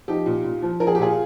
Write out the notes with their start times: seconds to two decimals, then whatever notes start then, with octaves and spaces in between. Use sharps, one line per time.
0.08 F3 D#4 G4
0.26 A#2
0.44 A#2
0.62 F3
0.80 F3 A#4
0.87 G#4
0.95 G4
0.98 A#2 F4 G#4